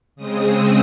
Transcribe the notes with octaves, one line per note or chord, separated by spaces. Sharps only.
C#3 G#3 C4 D#6
E6